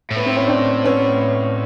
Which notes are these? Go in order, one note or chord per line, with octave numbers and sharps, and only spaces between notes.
A2
B3
C4
C#4
C4 D4
B3 C#4